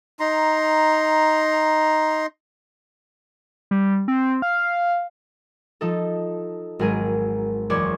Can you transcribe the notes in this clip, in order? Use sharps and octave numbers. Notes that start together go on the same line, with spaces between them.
D#4 A#5 C6
G3
C4
F5
F3 D#4 A4
G#1 F#3 G#4 A#4 D#7
F#1 E2 C5 D5 C#6 G#6